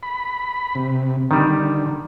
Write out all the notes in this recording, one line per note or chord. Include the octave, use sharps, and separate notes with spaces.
B5
C3
D3 D#3 G3